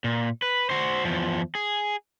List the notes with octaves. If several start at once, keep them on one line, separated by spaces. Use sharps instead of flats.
A#2
B4
F#4 C5
E2 F3
G#4